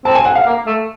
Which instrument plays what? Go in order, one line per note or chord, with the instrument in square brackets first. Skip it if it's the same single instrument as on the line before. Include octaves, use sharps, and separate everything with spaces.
[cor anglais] C4 [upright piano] A5
[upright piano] G#5
F#5
F5
[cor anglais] A#3
A3